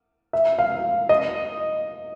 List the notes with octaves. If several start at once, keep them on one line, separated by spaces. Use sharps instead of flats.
E5
F5
D#5